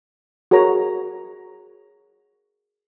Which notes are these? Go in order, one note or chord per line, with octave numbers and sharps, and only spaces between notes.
F#4 G#4 A#4 C#5 A#5